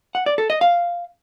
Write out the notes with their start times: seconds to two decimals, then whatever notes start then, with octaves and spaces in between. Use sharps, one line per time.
0.15 F#5
0.26 D5
0.38 A4
0.50 D#5
0.61 F5